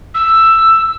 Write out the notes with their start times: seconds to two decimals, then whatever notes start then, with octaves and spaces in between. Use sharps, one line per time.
0.15 E6